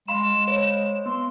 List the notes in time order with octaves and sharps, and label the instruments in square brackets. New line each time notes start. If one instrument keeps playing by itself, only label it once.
[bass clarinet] G#3 [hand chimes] F5 B5 C6 [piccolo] E7
[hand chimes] C5 C#5
[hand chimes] B3 [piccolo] C6